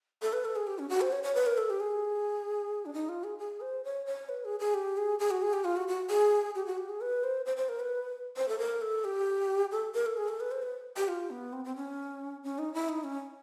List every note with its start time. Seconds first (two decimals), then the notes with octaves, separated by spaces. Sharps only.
0.22 A4
0.33 B4
0.45 A4
0.56 G#4
0.67 G4
0.79 C#4
0.89 F#4
1.01 C5
1.12 C#5
1.23 C#5
1.35 B4
1.46 A#4
1.58 A4
1.70 G4
1.80 G#4
2.85 D4
2.94 D#4
3.09 F4
3.24 G#4
3.38 G#4
3.61 C5
3.84 C#5
4.06 C#5
4.29 B4
4.45 G#4
4.60 G#4
4.74 G4
4.97 G#4
5.19 G#4
5.31 F#4
5.42 G#4
5.53 G4
5.64 F4
5.76 F#4
5.88 F#4
6.10 G#4
6.55 G4
6.66 F#4
6.78 G4
6.89 G#4
7.01 B4
7.24 C5
7.46 C5
7.57 C5
7.69 A#4
7.80 B4
8.37 C5
8.48 A4
8.59 A#4
8.81 A4
9.04 G4
9.72 A4
9.94 A#4
10.06 A4
10.17 G#4
10.28 A4
10.40 B4
10.51 C5
10.62 B4
10.97 G4
11.08 F4
11.30 B3
11.53 C4
11.65 C4
11.76 C#4
12.43 C#4
12.58 D#4
12.74 E4
12.89 D#4
13.04 C#4